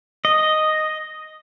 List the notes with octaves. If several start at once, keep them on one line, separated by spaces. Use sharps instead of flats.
D#5